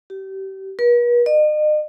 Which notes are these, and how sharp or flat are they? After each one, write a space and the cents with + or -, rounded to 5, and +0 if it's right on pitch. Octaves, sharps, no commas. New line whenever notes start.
G4 -30
B4 -45
D#5 -40